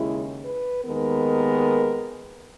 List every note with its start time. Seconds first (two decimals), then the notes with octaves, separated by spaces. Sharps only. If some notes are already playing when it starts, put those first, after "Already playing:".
Already playing: D#2 C#3 G#3 E4
0.45 B4
0.84 D#2 D#3 G#3 B3 A#4